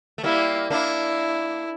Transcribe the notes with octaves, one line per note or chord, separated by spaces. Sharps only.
A3
G3 A#3 E4
A#3 D4 E4